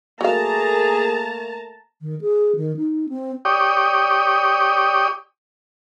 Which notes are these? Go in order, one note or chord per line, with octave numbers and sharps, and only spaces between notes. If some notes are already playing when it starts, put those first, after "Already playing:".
F#3 A3 A#3 G#4 F5 A5 A#5
D#3
G#4
D#3
D#4
C4
G4 C#5 D5 G5 D#6